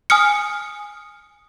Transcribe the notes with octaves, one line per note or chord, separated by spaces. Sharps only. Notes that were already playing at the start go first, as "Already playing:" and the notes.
G#5 D#6 F6 C#7